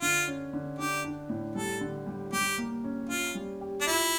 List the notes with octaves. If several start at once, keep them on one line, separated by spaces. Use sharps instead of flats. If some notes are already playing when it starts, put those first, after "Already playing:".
D3 F4
C#4
D3
D4 G4
D4
A2
G3 A4
D3
G3
G3 G4
A#3
C#4
C#4 F4
G3
G4
D4
E4 F4